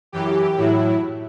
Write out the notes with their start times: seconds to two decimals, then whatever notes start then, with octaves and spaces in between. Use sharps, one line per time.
0.12 F#2 E3 G4
0.57 A2 F#3 E4